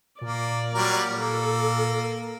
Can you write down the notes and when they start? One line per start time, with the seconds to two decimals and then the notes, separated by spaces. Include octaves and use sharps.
0.21 A#2 A#3 D5
0.74 F#3 G3 A#4
1.18 A#3 A4